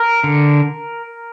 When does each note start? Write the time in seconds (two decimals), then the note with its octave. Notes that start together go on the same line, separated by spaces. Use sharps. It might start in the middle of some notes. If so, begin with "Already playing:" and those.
Already playing: A#4
0.24 D3